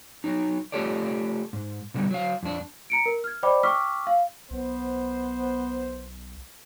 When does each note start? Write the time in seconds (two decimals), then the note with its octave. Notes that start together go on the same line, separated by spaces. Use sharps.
0.24 F#3 D#4
0.72 A3 F4 G4 A4 C#5 D5
1.53 G#2
1.94 B2 D3 G3
2.11 F#3 F5
2.43 F2 D4
2.90 A#5 C#7 D7
3.06 A#4
3.24 F6 G#6
3.43 C5 D5 D#5 G5 B5 D6
3.63 G5 C#6 D6 E6 F6 B6
4.07 F5
4.50 B1 B3 C5